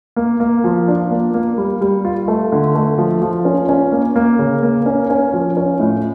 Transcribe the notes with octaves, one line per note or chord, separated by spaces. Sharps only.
A#3
A#3
F3
D4
A#3
A#3
G3
G3
F4
A3
D3
A3
F3
F3
C#4
C#4
A#3
A#3
C#3
A#3
C#4
C#4
F3
C#4
A2